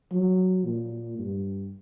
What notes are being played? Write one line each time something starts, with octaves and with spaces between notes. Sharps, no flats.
F#3
A#2
G2